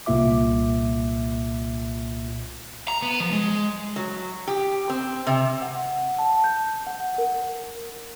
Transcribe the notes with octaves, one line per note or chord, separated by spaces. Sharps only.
C2 A#2 A#3 F4 E5 D6
A#5
B3
F3
G#3
F#3
G4
C4
C3
F#5
A5
G6
F#5
A#4